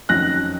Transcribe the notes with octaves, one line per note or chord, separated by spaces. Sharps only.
F2 D#3 F#3 C#4 F#6 A#6